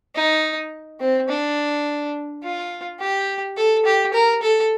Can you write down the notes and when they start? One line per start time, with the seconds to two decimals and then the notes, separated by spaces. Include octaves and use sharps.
0.15 D#4
1.00 C4
1.29 D4
2.43 F4
3.00 G4
3.57 A4
3.86 G4
4.14 A#4
4.42 A4